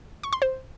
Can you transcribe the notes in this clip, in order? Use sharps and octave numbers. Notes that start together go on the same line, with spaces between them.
C#6
C6
C5